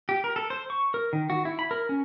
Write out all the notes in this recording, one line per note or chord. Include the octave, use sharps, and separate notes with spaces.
G4
A#4
A4
C5
C#6
A#4
D#3
F#4
E4
B5
A#4
C#4